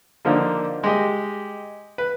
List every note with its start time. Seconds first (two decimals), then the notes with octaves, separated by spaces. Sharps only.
0.25 D3 F3 A#3 D4 D#4
0.84 G#3 G4 D#5
1.98 B4